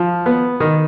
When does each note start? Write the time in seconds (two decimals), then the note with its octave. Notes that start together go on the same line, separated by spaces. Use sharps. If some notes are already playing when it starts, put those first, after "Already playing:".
Already playing: F3
0.26 B3
0.60 D#3